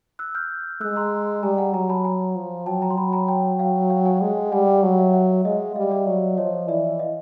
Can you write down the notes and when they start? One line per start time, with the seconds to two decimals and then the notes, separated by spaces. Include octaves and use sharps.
0.19 E6 F#6
0.35 F6 G6
0.81 G#3 E6 F#6
0.96 A#5 C6
1.43 G3 G#5 A#5
1.58 F#5 G#5
1.74 F#3 G#5 A#5
1.89 A5 B5
2.05 G#5 A#5
2.36 F3
2.66 F#3 G5 A5
2.82 G#5 A#5
2.90 C6
2.97 F#3 A5 B5
3.13 G#5 A#5
3.28 G5 A5
3.59 F5 G5
3.90 F5 G5
4.05 F#5 G#5
4.21 G#3
4.52 G3 F#5 G#5
4.68 F5 G5
4.83 F#3 F#5 G#5
4.98 E5 F#5
5.13 E5 F#5
5.45 G#3 D#5 F5
5.76 G3 D#5 F5
5.91 D5 E5
6.06 F#3
6.37 F3 C#5 D#5
6.68 E3 D5 E5
6.99 D#5 F5